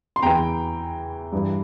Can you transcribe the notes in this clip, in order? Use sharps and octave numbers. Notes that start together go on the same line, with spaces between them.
C6
E2 E3 G5 A#5
G2 E3